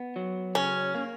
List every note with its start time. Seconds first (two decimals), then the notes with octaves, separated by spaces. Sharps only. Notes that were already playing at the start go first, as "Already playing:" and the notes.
Already playing: B3
0.16 F#3
0.55 C#3 C#4
0.95 A#3